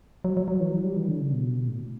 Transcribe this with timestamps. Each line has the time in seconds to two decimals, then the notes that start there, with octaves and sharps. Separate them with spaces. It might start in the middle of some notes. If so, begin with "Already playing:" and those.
0.24 F#3
0.37 F#3
0.48 F#3
0.60 E3
0.72 F#3
0.84 G3
0.97 E3
1.08 D3
1.20 C#3
1.32 B2
1.68 A2